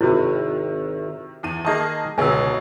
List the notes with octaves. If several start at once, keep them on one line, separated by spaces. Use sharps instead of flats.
G#1 C3 D#3 E4 F#4
E2 D#7
D#3 A#3 G#4 D#5 A5
G1 C#2 G#2 B2 G#4 G#5 E6